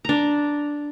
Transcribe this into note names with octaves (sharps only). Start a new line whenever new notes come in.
D4 A#5